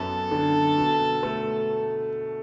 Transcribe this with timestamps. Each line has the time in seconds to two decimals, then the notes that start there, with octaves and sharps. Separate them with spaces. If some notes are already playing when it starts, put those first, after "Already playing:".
Already playing: F#2 B3 A4
0.31 D3
0.78 B2
1.23 A3